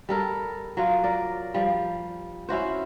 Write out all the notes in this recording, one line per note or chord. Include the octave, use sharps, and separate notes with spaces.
G3 A4 A#4
F#3 F4
A#4 D5
F3 G3
C#4 E4 F#4 C5